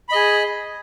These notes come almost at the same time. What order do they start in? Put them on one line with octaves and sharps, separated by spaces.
B5 D#5 G#4